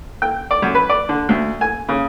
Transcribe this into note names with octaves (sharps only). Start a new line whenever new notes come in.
G5
D5
F#2
B4
D5
D3
D2
G#5
C#3